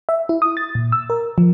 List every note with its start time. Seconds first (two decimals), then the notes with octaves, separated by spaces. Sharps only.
0.09 E5
0.29 E4
0.42 D#6
0.57 A6
0.75 A#2
0.92 E6
1.10 A#4
1.38 F3